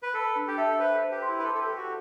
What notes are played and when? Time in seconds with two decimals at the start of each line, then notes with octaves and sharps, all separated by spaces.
0.03 B4
0.14 A4 B5
0.36 D4
0.47 G4
0.57 A4 E5
0.79 B4 C5
1.01 C5
1.11 G4
1.22 C6
1.28 E4
1.39 B4
1.44 A4 D6
1.55 A4
1.61 G4
1.66 A4
1.76 F#4